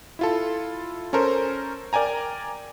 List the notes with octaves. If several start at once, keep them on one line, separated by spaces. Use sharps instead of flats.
E4 F4 A4
C#4 A4 A#4 C5
A#4 D5 G5 G#5 A#5